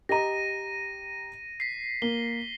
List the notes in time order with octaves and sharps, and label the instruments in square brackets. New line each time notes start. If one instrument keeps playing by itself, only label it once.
[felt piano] G4 D#5 A#5 [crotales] A#6 D#7
[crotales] B6 C7
[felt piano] A#3 [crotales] G7